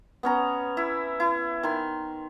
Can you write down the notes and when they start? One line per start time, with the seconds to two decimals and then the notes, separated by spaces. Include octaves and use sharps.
0.23 B3 C#4 A#5
0.77 E4
1.20 E4
1.63 D#3 C6